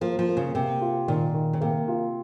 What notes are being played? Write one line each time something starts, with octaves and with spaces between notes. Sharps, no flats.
F3 A#3
F3
A#3
C#3
C3 A#3
F4
A#2 D#3
D#3
C#3
C3 A#3
F4